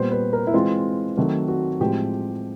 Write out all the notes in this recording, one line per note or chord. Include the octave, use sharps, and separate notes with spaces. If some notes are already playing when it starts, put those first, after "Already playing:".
Already playing: A#2 G3 B3 C5
B4
A#4
E4
E3 G#3 C4 F4
D#3 F#3 A3 C4 F#4
F#4
A2 F3 G#3 C4 G4